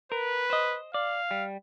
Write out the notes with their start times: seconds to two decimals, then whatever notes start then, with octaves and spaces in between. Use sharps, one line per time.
0.12 A#4 B4
0.50 C5 D#5
0.94 D5 F5
1.31 G3